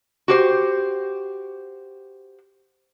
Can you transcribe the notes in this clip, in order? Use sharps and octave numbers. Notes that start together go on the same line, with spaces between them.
F#4 G4 C5